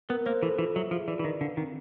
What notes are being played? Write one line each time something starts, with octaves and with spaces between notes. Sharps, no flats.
B3 A#4
A#3 C5
E3 A4
E3 F4
F#3 E5
F3 G#4
E3 D5
E3
D#3 B4
D3 F5
D#3 C4